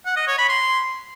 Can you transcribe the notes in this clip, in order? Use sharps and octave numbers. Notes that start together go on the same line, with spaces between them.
F#5
D#5
C#5
B5
C6